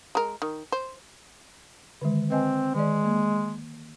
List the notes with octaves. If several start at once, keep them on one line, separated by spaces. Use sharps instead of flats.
G#3 A#4
D#3
C5
D3 D#3 G#3
C4 B4 D#5 G#5
D#3 G#3 D5
A#3